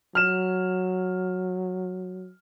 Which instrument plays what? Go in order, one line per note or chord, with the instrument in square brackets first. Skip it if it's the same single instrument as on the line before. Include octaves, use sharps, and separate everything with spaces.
[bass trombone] F#3 [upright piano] F6 E7